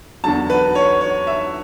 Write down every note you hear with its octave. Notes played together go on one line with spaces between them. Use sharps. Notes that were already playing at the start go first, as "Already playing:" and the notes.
E2 D3 F#3 A5
B4
C#5
C#5
E5